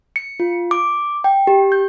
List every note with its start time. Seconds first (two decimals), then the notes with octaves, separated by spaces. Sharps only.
0.16 C#7
0.40 F4
0.71 D6
1.24 G5
1.47 G4
1.72 G6